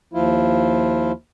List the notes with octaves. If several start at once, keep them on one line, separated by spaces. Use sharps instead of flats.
D#2 F3 E4 F4